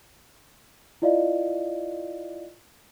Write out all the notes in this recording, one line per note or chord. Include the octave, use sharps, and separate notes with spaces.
E4 F4 D5 D#5 F5